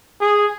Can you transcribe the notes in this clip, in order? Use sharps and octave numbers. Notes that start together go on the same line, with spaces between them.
G#4